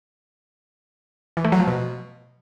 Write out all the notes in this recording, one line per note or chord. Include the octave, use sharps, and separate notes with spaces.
E3
A3
F#3
F3
B2